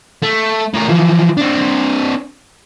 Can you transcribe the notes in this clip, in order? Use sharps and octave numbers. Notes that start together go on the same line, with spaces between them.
A3
A2 A#4
E3 F3
C4 D4